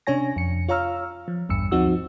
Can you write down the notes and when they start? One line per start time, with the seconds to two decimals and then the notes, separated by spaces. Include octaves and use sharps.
0.07 C3 C#4 D4 C#5 G#5 A#6
0.36 F2 C#7
0.68 F4 C#5 F5 A#5 E6 F6
1.28 F3
1.49 A1 E2 G2 E6 C#7
1.71 D2 F3 C4 D#4 F#4 E6